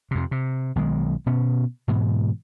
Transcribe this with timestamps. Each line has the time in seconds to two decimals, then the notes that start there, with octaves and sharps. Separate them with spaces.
0.11 F2 C3
0.31 C3
0.76 B1 D#3 G#3
1.26 B2 B3 C#4
1.88 G#2 B2 E3